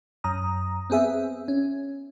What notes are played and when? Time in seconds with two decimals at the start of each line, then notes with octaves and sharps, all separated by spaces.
0.24 F#2 A#5 D#6
0.90 B3 C4 G#4 E5
1.48 C#4